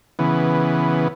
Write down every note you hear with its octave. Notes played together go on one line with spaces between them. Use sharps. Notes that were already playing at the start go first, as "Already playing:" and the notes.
C#3 E3 B3